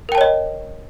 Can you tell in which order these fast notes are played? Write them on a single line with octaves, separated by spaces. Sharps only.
A#4 G5 A5 C#5 D#5